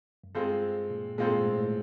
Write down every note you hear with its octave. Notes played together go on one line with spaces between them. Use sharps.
F#2
G2 G#3 C4 F4 A4 C5
A#2
A#2 G#3 C4 F4 A4 C5
A2
G#2
A2